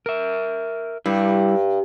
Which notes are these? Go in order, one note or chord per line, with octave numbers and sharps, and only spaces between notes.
A#4 E5
G2 G3 E4